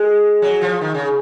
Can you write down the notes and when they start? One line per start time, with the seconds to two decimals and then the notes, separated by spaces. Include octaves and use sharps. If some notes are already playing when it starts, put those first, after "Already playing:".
Already playing: G#3
0.42 F#3
0.62 F3
0.81 D#3
0.94 C#3